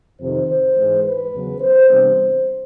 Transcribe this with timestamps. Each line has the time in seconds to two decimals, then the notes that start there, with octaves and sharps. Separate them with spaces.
0.19 F2 C3 D#3 C5
0.47 C5
0.76 G#2 E3 G#3
1.03 B4
1.33 E2 C#3 F#3 B3
1.60 C5
1.89 C3 E3 G3 B3 D4 C5